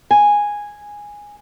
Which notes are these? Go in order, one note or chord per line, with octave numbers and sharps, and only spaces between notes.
G#5